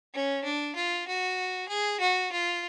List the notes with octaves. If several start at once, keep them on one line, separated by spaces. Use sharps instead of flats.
C#4
D4
F4
F#4
G#4
F#4
F4